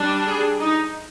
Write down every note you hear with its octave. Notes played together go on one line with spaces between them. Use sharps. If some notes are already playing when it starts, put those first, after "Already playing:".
Already playing: G3 D4
G#4
D#4